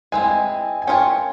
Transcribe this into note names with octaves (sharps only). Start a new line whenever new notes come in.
G#3 C4 E4 G#5
G#5
C#4 F4 A#4 C#5 G5